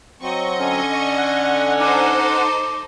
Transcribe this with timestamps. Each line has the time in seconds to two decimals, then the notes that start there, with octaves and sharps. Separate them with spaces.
0.22 F#3 C4 D#5 C#6
0.59 D3 C#4
1.17 F#5
1.80 D#4 A4 C5 D6